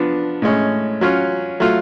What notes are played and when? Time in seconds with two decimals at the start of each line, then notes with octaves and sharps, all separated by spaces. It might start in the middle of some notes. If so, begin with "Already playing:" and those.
Already playing: F3 B3 D4
0.42 A2 G#3 C#4
1.01 F#3 C#4 F4
1.60 F#3 A3 F4